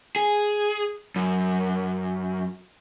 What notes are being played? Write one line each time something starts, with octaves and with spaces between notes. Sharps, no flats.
G#4
F#2